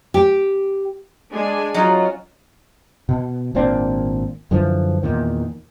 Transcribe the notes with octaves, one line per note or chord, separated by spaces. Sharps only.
G4
G#3 D4 G#5
F#3 C#4 D#4 F4 F#4
B2
G#1 A#2 C4 D4
F#2 D3 E3 F3
E2 A#2 D#3